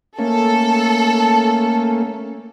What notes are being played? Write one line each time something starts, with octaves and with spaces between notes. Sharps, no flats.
A3 A#3 C#4 A4